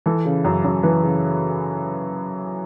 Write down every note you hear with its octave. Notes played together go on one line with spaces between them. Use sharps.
E3 A4
C#3
F#2
F#2
E3 B4
C#3